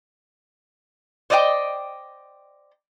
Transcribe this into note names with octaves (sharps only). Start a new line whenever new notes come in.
C5 D5 D#5 F5 G5